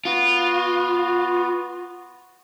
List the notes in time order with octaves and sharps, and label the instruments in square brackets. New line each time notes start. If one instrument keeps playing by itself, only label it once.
[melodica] B3 F#4 [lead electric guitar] F4